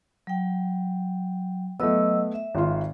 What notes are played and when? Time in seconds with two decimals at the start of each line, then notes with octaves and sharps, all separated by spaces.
0.27 F#3 G5
1.80 F#3 A3 B3 D#5 E6
2.34 E5
2.55 G#1 F4